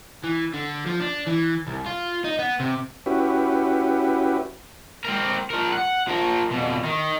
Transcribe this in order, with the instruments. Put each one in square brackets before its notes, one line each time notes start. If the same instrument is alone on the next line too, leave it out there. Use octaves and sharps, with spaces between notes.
[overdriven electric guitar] E3
D3
F3
D4
E3
C2
F4
D#4
B3
C3
[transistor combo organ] C#4 E4 F#4 G4 B4
[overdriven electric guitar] C4 A#4
F3 A#4
F#5
F3 A#4
F2 B2
D#3